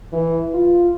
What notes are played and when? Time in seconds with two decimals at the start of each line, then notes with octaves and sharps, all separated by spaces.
0.13 E3
0.54 F4